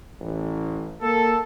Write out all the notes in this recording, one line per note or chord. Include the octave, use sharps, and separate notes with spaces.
A1
A#3 A4